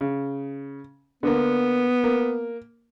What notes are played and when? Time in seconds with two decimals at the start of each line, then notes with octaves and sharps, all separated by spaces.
0.01 C#3
1.23 D3 A#3 B3
2.04 A#3